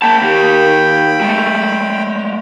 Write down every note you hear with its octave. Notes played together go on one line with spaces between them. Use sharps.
A#3 G5 A5 B5
D#2 G4
G#3 A3